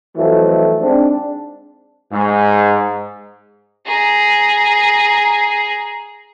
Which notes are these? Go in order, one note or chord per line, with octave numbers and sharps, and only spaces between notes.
F2 E3 F#3 A3
G#2 C4 D4
G#2
G#4 A#5